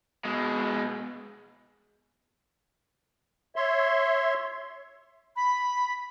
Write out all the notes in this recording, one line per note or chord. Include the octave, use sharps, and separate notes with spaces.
B2 G#3
C#5 E5 C6
B5